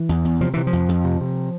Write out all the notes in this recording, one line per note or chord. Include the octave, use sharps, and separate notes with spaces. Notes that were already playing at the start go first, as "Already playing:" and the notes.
Already playing: E3
E2
E2
C3 F3
C3 E3
F3
F2
F2
C3
C3